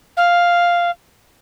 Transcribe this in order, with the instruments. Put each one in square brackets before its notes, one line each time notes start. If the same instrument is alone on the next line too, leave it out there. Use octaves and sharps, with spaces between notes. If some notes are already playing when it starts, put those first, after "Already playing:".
[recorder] F5